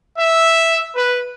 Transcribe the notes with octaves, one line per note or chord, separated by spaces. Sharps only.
E5
B4